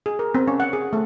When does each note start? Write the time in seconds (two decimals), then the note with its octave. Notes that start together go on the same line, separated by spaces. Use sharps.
0.06 G#4
0.19 A#4
0.35 C4
0.48 C#4
0.60 F#5
0.73 G#4
0.93 A3